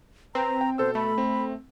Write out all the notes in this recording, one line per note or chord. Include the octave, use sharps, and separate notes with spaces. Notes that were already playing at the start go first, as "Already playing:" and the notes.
C4 B4 A#5
G5
B2 A4 C5 E6
A3 B5
C4